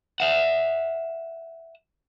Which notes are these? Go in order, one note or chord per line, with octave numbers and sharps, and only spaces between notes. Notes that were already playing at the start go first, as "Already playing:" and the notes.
E5 F#5